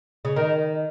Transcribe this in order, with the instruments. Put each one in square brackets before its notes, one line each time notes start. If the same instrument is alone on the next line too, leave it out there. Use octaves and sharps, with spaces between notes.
[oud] C#3
[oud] D#3 [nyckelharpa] A#4